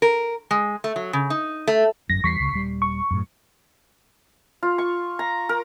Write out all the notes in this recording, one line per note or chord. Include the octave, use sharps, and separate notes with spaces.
A#4
G#3
A3
F#3
C#3
D#4
A3
G1 F#2 A#6
E2 E3 G3 C#6 B6 C7
C#2 C#3
D#1 G3
C#6
F#2 A2
F4
C#6
A#5
A#4